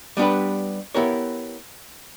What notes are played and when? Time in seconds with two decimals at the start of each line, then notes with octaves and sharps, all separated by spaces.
0.17 G3 B3 D4 G4 B4
0.94 B3 E4 G4 A#4 C#5